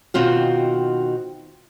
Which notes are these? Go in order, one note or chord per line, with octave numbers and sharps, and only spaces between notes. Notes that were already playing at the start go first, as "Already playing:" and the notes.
B2 D#3 C4 F4 F#4